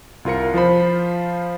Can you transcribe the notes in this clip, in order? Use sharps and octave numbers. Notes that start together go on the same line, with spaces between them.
C2 F4 A#4 C#7
F3 F4 C5 B5